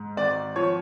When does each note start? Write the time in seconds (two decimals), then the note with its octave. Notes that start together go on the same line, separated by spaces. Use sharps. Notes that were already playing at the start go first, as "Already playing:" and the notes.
Already playing: G#2
0.17 G#1 D5
0.56 F3 C#5